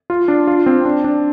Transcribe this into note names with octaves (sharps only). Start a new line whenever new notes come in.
F4
D4
F4
C4
D4
D4